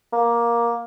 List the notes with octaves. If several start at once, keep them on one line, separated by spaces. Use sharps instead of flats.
A#3